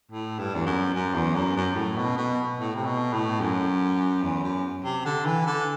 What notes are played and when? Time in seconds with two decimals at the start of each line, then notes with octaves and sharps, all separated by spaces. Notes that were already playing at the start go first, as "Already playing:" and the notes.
0.11 A2
0.39 G2
0.55 E2
0.66 F#2
0.94 F#2
1.14 E2
1.35 F#2
1.56 F#2
1.76 A2
1.97 B2
2.18 B2
2.59 A2
2.75 C3
2.86 B2
3.13 A2
3.41 F#2
4.23 E2
4.43 F#2
4.84 C3
5.05 D3
5.25 E3
5.47 D3